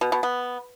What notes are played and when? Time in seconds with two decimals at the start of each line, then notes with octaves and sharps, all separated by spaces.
0.01 B2
0.12 B2
0.23 B3